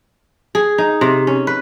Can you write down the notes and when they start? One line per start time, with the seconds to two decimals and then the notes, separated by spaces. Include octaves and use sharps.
0.55 G#4
0.78 D#4
1.01 C3
1.27 C#4
1.47 B4